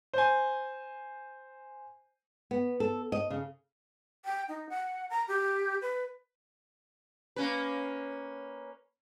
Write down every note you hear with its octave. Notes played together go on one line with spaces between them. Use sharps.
C5 G#5
B3
A4
D#5
C#3
G5
D#4
F#5
A#5
G4
B4
A#3 C#4 B4